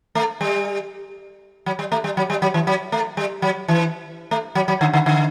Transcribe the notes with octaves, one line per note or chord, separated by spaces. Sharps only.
A3
G3
F#3
G3
A3
G3
F#3
G3
F#3
E3
F#3
A3
G3
F#3
E3
A3
F#3
F#3
D3
D3
D3